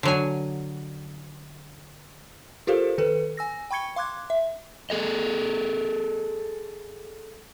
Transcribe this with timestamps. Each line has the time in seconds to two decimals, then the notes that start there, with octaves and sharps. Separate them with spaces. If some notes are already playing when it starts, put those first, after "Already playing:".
0.03 D3 F#3 G#5
2.67 F4 G4 A4 A#4 C5 F5
2.98 D#3 A4 B4
3.37 G#5 E6 A#6
3.71 G5 B5 C#6 G#6 C#7 G7
3.96 F5 C6 D6 F#6 G#6
4.30 E5
4.90 G#4 A4 D#5